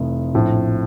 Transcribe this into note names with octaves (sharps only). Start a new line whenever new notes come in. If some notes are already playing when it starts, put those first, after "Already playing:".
Already playing: F1 F2 E3 A3
A#1 A2 F3 C4